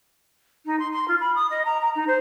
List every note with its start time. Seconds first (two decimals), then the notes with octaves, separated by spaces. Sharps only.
0.65 D#4
0.79 C6
0.92 C6
1.08 F4
1.20 B5
1.35 D#6
1.50 D#5
1.65 A#5
1.81 A#5
1.95 D#4
2.07 C5